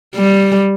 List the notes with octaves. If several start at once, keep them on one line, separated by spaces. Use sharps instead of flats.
G3